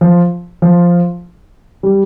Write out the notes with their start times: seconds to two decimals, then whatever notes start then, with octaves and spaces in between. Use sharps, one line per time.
0.01 F3
0.62 F3
1.83 G3